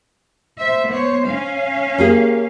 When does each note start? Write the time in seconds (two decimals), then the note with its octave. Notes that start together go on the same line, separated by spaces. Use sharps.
0.58 C5 E5
0.90 B3 C5 C#5
1.27 C#4 F5
1.98 A#3 G4 G#4